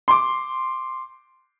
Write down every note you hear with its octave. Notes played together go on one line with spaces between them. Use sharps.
C6 D6